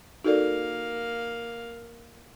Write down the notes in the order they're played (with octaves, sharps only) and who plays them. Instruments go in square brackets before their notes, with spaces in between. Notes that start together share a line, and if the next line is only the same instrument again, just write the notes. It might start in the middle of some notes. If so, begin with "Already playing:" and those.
[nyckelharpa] A#3 F5 [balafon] D#4 A4 [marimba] F#4 A#4 D5